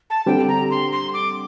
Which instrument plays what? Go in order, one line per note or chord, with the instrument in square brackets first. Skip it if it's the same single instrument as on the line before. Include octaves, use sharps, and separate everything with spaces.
[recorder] A5
[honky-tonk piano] D3 G3 C4 G4 [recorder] G5
[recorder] A#5
C6
C6
D6